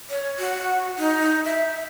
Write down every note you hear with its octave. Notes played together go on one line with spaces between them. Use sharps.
C#5
F#4
D#4
E5